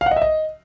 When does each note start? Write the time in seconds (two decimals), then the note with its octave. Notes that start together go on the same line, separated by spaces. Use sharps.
0.01 F5
0.06 F#5
0.11 D#5
0.16 E5
0.22 D#5